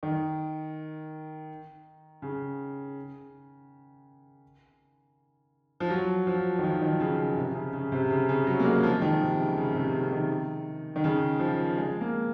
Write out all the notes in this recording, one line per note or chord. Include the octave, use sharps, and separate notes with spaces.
D#3
C#3
F3
F#3
F3
D#3
F3
D#3
C#3
C#3
C3
C#3
C#3
C3
C#3
C#3
F#3
A#3
G#3
F3
D#3
C3
C#3
C#3
C3
C#3
D#3
D#3
C#3
F3
G#3
A#3